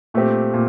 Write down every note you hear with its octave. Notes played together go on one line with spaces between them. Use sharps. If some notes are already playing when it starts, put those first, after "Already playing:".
A#2 A3 C4 G4
A#2